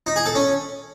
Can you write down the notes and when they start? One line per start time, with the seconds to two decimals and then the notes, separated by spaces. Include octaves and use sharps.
0.07 D#4
0.16 G#4
0.26 A4
0.35 C#4